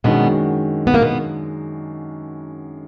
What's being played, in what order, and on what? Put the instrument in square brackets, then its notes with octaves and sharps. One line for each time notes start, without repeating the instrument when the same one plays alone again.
[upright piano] F#2 D#3 G#3 D4 F#4 [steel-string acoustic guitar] B2 B3
[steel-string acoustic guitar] B3
A#3
B2 B3